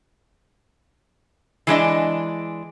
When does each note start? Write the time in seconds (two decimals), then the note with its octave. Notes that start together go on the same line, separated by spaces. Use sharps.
1.67 E3 G#3 D4 D#5